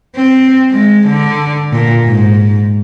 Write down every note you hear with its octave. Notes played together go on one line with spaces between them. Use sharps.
C4
G#3
D3
A#2
G#2